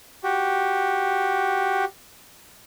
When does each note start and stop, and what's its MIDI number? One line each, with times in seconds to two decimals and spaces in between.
0.24 1.85 66
0.24 1.85 67